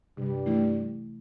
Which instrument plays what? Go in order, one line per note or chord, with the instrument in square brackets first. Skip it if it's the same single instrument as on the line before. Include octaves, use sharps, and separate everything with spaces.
[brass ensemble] G2 G3 [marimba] C3
[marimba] E3 A3 E4